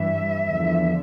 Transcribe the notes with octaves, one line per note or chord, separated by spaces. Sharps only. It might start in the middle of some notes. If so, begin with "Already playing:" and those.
Already playing: G2 E3 G3 E5
E2 D3 F3